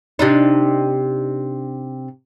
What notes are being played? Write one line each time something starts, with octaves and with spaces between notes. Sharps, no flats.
C3 D4 D#4